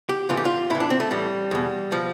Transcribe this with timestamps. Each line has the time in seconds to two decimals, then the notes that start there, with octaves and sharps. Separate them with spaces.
0.09 G4
0.29 A2 E3 F4
0.37 G4
0.45 F4
0.70 A2 E3 E4
0.80 D4
0.90 C4
1.00 A3
1.11 A2 E3 G3
1.51 E2 B2
1.92 B2 F3